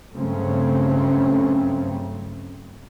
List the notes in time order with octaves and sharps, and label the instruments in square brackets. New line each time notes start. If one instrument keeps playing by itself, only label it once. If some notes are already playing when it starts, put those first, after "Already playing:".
[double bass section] G2 C#3 F#3 A3 C4 C#4